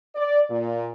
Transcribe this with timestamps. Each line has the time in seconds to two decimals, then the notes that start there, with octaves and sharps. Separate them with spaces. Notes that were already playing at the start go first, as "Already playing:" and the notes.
0.15 D5
0.50 A#2